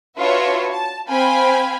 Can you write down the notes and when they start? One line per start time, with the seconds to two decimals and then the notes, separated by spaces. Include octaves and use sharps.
0.18 D4 F4 F#4 B4 C#5 E5
0.71 A5
1.10 C4 F5 G5 G#5 B5